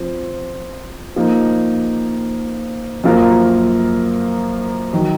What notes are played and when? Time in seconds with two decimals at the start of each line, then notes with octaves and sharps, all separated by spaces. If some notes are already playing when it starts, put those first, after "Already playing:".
Already playing: F3 C4
1.16 F3 A#3 D#4
3.04 F#2 F3 A#3 F4 A#4
4.93 D#3 F#3